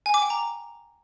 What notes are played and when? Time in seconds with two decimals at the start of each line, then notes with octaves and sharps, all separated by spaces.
0.06 G#5
0.14 D6
0.22 G5
0.30 A#5